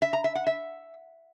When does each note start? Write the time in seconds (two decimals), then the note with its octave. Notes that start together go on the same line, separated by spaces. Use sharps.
0.02 E5
0.13 A#5
0.24 E5
0.35 F#5
0.47 E5